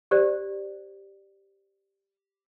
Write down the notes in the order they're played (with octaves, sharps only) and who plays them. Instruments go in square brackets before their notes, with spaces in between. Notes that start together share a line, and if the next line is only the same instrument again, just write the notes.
[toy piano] G4 C5 D5